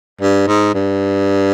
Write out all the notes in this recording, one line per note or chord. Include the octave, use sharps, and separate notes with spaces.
G2
G#2
G2